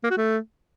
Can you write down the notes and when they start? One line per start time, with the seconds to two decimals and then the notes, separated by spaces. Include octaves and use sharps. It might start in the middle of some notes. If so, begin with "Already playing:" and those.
0.04 A#3
0.11 F#4
0.18 A3